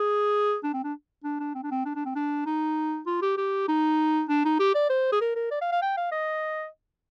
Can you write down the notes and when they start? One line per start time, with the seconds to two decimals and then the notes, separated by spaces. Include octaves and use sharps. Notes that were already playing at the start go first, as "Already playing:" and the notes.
Already playing: G#4
0.63 D4
0.74 C4
0.84 D4
1.24 D4
1.40 D4
1.55 C4
1.63 D4
1.71 C4
1.85 D4
1.95 D4
2.05 C4
2.15 D4
2.46 D#4
3.07 F4
3.22 G4
3.38 G4
3.68 D#4
4.29 D4
4.45 D#4
4.60 G4
4.75 D5
4.90 C5
5.13 G#4
5.21 A#4
5.36 A#4
5.51 D5
5.61 F5
5.72 F5
5.82 G5
5.97 F5
6.12 D#5